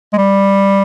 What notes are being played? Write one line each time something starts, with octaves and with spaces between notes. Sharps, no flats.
G#3
G3